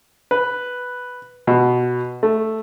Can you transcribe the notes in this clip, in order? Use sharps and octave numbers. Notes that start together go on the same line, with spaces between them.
B4
B2
A3